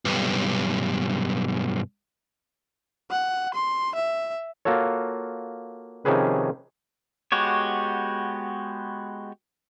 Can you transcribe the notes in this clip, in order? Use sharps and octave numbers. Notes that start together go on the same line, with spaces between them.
B1 G2
F#5
C6
E5
A#3 F4 F#4 A4 C#5
C3 D#3 F3 C#4 G#4 B4
G#3 B3 F#4 G4 C#5